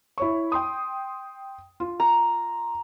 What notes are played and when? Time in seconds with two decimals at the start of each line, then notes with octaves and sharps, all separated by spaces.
0.18 E4 C#5 C#6
0.52 G5 C6 D#6
1.80 F4
2.00 A#5